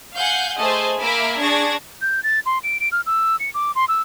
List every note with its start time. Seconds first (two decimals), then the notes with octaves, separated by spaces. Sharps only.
0.15 F5 F#5 G#5 G6
0.58 A3 G#4 C5 D#5 G#5 A5
0.98 A#3 A#4 E5 G#5 B5 D6
1.39 D4 G#4 A5 C#6 G#6 A#6
2.02 G6
2.23 A6
2.46 C6
2.64 D7
2.80 D7
2.92 F6
3.06 E6
3.40 C#7
3.54 D6
3.75 C6
3.88 E6